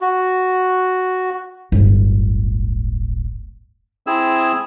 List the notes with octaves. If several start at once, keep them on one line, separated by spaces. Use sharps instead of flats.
F#4
D1 G1
C4 E4 G#4 E6